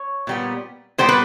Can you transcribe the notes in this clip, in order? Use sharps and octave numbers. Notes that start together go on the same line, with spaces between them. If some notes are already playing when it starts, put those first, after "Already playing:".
Already playing: C#5
A#2 G3 B3
A#2 G3 B3 C5
B4